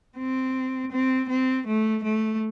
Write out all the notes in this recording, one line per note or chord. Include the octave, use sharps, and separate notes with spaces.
C4
C4
C4
A3
A3